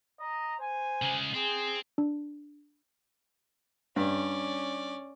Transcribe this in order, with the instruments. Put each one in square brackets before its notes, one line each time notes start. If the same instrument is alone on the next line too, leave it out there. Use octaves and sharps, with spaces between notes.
[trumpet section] D#5 A#5
C5 G#5
[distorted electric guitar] C#3 G#3
[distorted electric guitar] C4 [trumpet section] G#4
[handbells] D4
[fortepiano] G2 [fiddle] C#4 D5